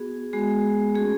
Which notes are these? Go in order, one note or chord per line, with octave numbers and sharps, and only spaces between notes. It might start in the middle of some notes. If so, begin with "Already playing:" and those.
Already playing: B3 F#4 G#4
G#3 B3 F#4 G#4
A3 C#4 F#4 G#4